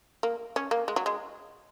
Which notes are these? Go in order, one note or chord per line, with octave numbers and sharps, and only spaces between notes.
A#3
C#4
A#3
G#3
F#3
G#3